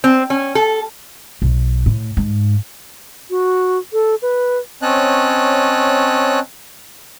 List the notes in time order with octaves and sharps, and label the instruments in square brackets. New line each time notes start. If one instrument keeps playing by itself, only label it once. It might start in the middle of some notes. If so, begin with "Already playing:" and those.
[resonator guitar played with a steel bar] C4
C#4
A4
[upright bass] B1
A2
G#2
[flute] F#4
A4
B4
[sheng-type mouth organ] C4 C#4 C#5 D#5 A5 F#6